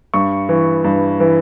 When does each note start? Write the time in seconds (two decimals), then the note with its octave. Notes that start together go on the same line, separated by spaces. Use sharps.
0.14 G2 C#6
0.49 E3
0.84 G2
1.20 E3